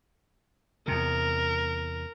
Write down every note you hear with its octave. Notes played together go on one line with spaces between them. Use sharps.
E2 C3 A#4